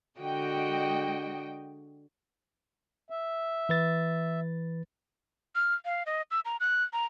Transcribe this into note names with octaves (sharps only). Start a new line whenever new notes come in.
D3 G#3 F#4 D#5 G5
E5
E3 B4 A6
F6
F5
D#5
E6
A#5
F#6
A#5